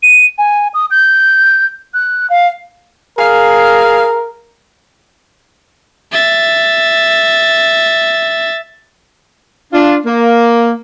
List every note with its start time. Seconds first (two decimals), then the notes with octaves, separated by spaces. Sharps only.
0.03 D#7
0.38 G#5
0.74 D#6
0.91 G6
1.94 F#6
2.30 F5
3.18 G#4 A#4 F5
6.12 E5 A6
9.73 D4 F4
10.06 A#3